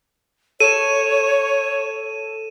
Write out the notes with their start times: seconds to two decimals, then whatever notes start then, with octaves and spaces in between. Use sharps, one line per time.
0.60 A4 C#5 D#7 E7